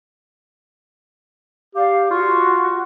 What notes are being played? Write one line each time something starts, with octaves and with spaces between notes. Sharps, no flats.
G4 D5 F5
F4 F#4 C#6